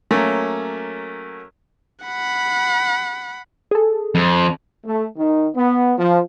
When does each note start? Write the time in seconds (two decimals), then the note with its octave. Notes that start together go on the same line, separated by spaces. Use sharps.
0.11 F#3 A3 A#3 C#4
2.05 F#5 B5
3.71 G#4 A4
4.15 F2
4.85 A3
5.18 D#3
5.55 B3
5.98 F3